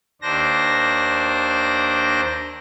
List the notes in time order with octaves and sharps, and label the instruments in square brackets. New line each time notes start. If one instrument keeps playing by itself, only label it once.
[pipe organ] D#2 D4 C5 A#6